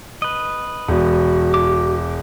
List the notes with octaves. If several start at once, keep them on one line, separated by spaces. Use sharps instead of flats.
B4 D#5
E1 F#4
D6